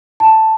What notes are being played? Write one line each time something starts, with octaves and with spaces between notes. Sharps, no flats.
A5